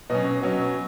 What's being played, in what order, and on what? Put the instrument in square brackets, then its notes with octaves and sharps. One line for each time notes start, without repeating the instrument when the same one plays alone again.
[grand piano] B2 F#3 C#4 D#5
B2 F#3 C#4